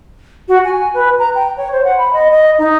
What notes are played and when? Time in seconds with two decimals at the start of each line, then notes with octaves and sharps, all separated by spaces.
0.48 F#4
0.65 G#5
0.94 B4
1.19 A#5
1.35 G5
1.57 C#5
1.72 C5
1.85 F#5
1.98 B5
2.13 D#5
2.31 D#5
2.58 D#4